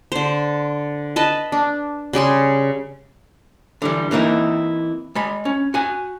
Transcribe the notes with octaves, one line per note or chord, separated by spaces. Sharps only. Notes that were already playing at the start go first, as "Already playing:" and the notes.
D3 C5
B4 D#5 A5
D4
C#3 G3 G#4 C6
D3 E3 G3
E3 A#3 C4 D#4 E4
G#3 B5
C#4
F#4 G#5